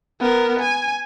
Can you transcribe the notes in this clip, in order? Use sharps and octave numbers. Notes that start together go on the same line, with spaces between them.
B3 A#4
G#5